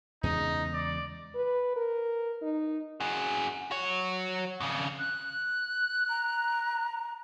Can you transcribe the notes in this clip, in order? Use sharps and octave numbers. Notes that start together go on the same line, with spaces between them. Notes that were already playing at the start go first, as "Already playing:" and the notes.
E2 C#3 G#3 D#4
D5
B4
A#4
D#4
F#4 G#4
F#4 C#5
F2 C#3
F#6
A#5